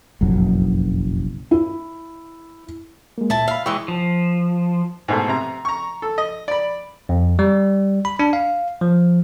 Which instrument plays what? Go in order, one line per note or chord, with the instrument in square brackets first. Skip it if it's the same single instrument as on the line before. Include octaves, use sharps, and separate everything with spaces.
[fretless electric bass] F#1 B1 F2 F#3
[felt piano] E4
[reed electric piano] G#3 A#3
[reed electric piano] C#2 A#2 [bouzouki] E4 A5
[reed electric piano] E5 B5 [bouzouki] F5
[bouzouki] E3 G#3 [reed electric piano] G5 C#6 E6
[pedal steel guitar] F3
[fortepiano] G#2 B2 A3
C3 A#5
A#5 C#6
A4
D#5
D5 B5
[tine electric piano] F2
G3
B5
D4
F5
F3